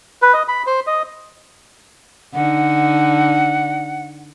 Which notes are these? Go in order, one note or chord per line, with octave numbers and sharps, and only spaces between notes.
B4
D#5
B5
C5
D#5
D3 D#4 F#5